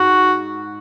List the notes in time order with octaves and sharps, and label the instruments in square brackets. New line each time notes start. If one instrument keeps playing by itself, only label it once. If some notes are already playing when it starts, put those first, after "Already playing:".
Already playing: [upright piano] G#2 [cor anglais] F#4